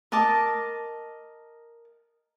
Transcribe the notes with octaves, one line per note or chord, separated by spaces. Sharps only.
A#4 D#5 A5 D6